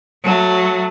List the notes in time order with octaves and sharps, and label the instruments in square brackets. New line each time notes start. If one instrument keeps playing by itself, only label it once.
[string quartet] F#3 A3